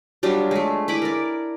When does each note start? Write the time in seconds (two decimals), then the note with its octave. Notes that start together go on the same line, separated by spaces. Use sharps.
0.23 F#3 G3 D4 F4
0.51 G#3 A3
0.88 E4 B4 B5 D6
1.02 A#4 D5